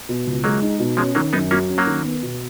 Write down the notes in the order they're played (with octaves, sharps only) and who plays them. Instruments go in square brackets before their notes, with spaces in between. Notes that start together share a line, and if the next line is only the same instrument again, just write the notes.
[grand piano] B2
C#2
[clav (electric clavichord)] F#3 A#3 [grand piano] G#3
[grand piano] D#4
B2
[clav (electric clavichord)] F3 G#3 [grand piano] C#4
[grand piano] D#3 [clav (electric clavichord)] F#3 A#3
[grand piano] F#2 [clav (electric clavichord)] B3 D#4
[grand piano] F#3 [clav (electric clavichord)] A#3 C#4
[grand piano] C#4
[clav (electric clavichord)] F#3 A#3
[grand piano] D#3
B3
B2